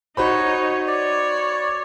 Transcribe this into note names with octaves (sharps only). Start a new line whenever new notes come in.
D#4 F#4 C5 C#5 B5
C#5 D5